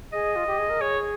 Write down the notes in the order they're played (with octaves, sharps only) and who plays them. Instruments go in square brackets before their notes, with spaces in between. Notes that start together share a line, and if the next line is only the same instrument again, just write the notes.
[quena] G#4 [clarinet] D#5
[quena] F4
G4
G#4
A#4
[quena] G#4 [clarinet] C#5